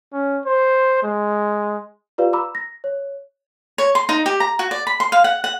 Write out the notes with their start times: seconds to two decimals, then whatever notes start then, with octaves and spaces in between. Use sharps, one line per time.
0.13 C#4
0.46 C5
1.03 G#3
2.18 F4 G4 B4 D5 F5
2.33 A#5 B5 D6 E6
2.55 A#6
2.84 C#5
3.78 C#5
3.95 C6
4.09 D#4
4.26 G4
4.40 A#5
4.59 F#4
4.71 D5
4.87 B5
5.00 C6
5.12 F5
5.24 F#5
5.44 F#5